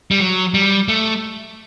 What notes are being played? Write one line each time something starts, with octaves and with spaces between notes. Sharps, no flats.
G3
F#3
G3
A3